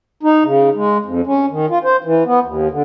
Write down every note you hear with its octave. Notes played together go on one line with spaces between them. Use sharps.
D#4
C#3
G#3
F2
C#4
D#3
F4
C5
E3
B3
D#2
D3